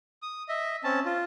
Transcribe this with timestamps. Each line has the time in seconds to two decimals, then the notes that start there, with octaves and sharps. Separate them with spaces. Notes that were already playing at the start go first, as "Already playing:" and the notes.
0.22 D#6
0.49 D#5 E5
0.84 C4 C#4 A5
1.05 F4